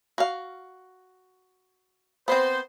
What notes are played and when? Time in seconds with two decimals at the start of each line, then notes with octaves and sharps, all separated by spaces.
0.18 F#4 F5
2.28 B3 C4 C5